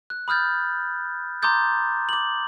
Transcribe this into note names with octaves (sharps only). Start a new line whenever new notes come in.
F#6
B5 D#6 F6 G6 A6
A#5 C6 D6 D#6 G6 A6
D6 F#7